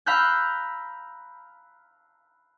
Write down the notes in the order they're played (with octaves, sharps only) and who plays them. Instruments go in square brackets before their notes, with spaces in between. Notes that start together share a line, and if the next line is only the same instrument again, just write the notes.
[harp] F5 A#5 B5 E6 F#6 G6